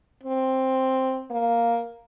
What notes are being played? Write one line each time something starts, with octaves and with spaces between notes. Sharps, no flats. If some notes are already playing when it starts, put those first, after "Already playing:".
C4
A#3